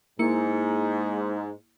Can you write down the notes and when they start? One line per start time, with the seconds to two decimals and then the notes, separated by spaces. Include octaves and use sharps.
0.19 G#2 A#3 E4 C#7